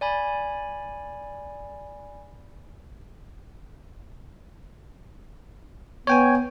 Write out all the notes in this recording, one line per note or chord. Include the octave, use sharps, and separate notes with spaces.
D5 G#5 B5
B3 C#5 G5 G#5